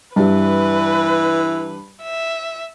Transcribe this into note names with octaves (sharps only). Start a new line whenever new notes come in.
G2 E3 G3 B4
E5